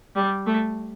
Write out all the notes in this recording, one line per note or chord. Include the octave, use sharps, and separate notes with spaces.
G3
A3